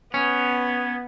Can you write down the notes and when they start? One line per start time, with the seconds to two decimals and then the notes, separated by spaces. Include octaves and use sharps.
0.14 B3 C#4